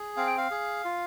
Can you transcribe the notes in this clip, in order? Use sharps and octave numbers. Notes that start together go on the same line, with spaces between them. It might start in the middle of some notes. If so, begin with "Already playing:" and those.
Already playing: G#4
C4 F5
G5
F5
G#4
F4